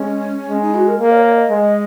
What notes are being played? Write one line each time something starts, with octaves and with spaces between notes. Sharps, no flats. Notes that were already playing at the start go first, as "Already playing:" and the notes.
Already playing: G#3 C#4
G#3
D#4
F#4
A#4
A#3 A#4
D#5
C#5
D#5
G#3